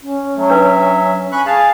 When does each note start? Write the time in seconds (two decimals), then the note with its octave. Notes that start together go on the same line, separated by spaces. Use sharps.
0.02 C#4
0.36 F#3 A3
0.50 D4 B4 E5
1.32 G#5 B5 C#6 F#6
1.46 G#4 F5 G#5 A5